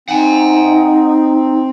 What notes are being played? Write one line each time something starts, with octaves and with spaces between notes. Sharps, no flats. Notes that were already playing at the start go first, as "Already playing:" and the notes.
C4 D#4 F#5 G#5